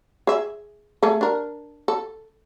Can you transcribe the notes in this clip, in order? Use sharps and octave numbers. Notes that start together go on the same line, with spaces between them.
G#4 E5
A3 G#4 A4
D4 A#4
A4